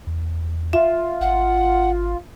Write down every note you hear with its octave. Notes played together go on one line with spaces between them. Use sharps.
E2
F4 E5
G#1 F#5